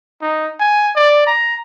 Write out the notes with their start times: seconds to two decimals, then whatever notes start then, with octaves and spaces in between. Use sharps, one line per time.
0.22 D#4
0.60 G#5
0.96 D5
1.27 A#5